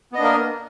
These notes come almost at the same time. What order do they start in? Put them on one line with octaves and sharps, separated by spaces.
B3 D#5 D4 A#3 A#4